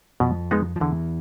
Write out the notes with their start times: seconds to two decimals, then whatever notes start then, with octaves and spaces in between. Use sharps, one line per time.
0.20 F2 B2 F3
0.51 G#3 B3 D#4
0.76 F3
0.80 E2 D3 E3